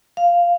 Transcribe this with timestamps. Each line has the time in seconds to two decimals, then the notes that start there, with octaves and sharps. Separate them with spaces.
0.17 F5